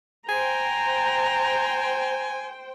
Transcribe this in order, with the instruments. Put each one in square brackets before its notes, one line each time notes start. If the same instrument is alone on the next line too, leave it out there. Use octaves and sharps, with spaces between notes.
[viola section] C5 G5 [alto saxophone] G#5 [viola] A#5